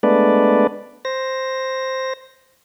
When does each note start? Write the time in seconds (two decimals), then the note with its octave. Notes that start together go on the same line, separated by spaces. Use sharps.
0.03 G#3 A3 B3 D4 B4 D5
1.05 C5 A#6